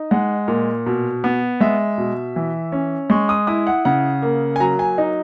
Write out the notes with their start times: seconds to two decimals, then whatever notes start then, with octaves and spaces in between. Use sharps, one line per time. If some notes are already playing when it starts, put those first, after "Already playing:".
Already playing: D#4
0.11 G#3 F#5
0.48 A#2
0.86 B2
1.24 B3
1.61 G#3 E5
1.98 B2
2.36 E3
2.72 C#4
3.10 G#3 C#6
3.29 D#6
3.47 E4 D#6
3.67 F#5
3.85 C#3 F#5
4.22 A#3
4.56 G#5
4.60 F#3 A#5
4.79 G#5
4.98 D#4